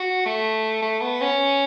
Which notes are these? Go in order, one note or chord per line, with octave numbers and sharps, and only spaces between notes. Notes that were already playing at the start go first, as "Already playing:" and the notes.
Already playing: F#4
A3
A3
B3
C#4